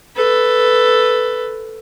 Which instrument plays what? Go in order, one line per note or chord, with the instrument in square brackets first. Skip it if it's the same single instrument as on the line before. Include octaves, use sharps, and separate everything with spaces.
[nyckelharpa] A4 B4